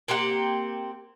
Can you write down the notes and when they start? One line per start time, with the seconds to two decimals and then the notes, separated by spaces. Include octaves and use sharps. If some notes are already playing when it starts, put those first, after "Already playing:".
0.08 A#3 C4 G4 F#5